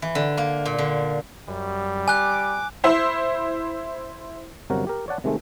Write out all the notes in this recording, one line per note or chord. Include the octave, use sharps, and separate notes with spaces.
E3
D3
A#3
A#2
D3
F#2 G3
G#5 D6 F#6
E4 C5 E5
G1 C3 F#3 F#4 A#4
G4 A#4
C#5 D5 F#5 A5
C3 D#3 G#3 A3